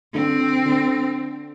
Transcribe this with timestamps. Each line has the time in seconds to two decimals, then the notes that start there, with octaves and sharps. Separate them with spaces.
0.14 D3 C4
0.66 D3